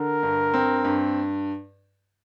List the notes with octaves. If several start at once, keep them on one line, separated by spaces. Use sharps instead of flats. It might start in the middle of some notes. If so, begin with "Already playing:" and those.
Already playing: D3 A#4
G2
C4
G2